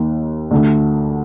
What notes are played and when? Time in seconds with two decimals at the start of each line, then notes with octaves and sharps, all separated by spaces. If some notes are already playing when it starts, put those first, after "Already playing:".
Already playing: D#2 D#3 A#3
0.51 D2 D3 A3